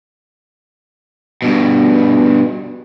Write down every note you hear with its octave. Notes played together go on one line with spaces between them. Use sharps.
G2 B2